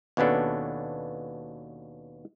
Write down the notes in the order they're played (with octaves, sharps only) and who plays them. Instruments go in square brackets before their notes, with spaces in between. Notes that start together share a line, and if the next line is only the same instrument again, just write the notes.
[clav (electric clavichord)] D#2 B2 B3 C#4 D4 A4